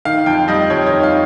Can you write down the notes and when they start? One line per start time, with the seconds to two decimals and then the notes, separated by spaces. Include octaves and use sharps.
0.05 D#3 F5
0.26 F2 G5
0.48 G3 D#5
0.70 F2 C#5
0.86 C#5
0.92 D#3
1.03 F5